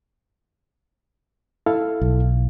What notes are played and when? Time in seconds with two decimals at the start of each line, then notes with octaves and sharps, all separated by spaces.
1.66 E4 A4 F5
2.01 B1